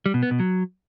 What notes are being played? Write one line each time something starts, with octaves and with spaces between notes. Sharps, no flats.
G3
B2
B3
B2
F#3